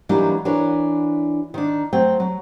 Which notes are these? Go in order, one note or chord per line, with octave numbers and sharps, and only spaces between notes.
E3 F#3 G3 A#3 D4 D#4
E3 D4 F#4 A#4 C#5
D#3 D4
F#3 A3 C4 G5
F#3